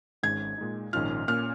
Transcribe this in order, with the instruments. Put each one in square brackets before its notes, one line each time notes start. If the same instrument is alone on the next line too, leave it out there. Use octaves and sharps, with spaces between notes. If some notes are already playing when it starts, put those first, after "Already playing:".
[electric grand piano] G#1 G#2 G#3 C#4 [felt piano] G#6
[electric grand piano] A#2 G#3 D#4
[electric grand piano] A#1 G#2 D#3 C#4 F4 [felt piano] F6
[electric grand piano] A#2 A#3 C#4 [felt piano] F6